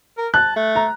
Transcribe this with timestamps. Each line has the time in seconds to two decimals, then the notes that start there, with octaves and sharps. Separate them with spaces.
0.18 A#4
0.34 A5 F#6
0.56 A3
0.76 A#5